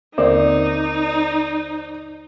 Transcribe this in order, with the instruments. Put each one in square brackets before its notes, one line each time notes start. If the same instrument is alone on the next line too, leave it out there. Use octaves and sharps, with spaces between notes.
[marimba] D#2 D3 [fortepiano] A#3 C4 [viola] D#4 [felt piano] C5 D5